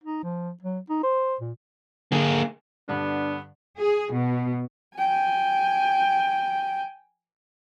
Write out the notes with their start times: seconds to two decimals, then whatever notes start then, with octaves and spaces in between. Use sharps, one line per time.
0.04 D#4
0.23 F3
0.62 F#3
0.89 D#4
1.03 C5
1.40 A#2
2.12 D3 A#3 G#4
2.88 G2 D3 B3 D4
3.78 G#4
4.13 B2
4.97 G5 G#5